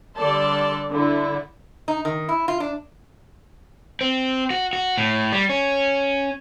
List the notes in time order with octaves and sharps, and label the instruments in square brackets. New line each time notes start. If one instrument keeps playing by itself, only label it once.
[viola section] D3 G3 A4 D5 A5 C6
D3 E4
[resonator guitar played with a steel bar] D#4
D#3
E4
F4
D4
[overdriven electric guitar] C4
F#4
F#4
A2
G3
C#4